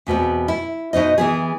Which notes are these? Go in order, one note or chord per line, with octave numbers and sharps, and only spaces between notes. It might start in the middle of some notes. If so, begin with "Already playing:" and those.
E2 B2 B3 C4
E4
B2 D#4 C5 D#5
E3 B3 G#4